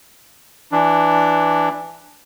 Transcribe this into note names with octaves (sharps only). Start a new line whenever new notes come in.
E3 D4